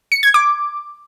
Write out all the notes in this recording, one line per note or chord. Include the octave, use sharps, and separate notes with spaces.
C#7
G#6
D6